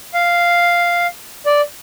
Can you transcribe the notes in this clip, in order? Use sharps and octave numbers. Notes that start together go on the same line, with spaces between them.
F5
D5